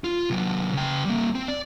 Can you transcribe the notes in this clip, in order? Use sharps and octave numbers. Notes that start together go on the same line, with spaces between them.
F4
C3 F#3
C#3 G5
G3 A#3
C4
D5